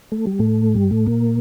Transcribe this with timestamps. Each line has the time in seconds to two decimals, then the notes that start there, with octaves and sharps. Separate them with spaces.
0.12 A3
0.27 G3
0.39 A2 A3
0.74 G2 G3
0.91 A2 A3
1.07 A#2 A#3